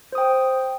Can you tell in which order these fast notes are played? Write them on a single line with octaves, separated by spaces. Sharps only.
C5 D#6 G5